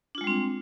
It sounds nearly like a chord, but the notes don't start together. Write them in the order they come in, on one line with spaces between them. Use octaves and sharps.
D4 F4 G#3 G3 C4